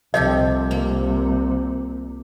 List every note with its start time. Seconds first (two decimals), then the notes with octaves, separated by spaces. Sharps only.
0.14 C2 C3 F3 G4 A4 D#5
0.71 A#3